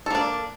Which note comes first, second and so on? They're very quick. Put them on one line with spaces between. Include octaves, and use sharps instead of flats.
A4 A#3 D4